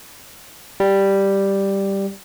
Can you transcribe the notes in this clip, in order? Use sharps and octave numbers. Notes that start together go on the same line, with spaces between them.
G3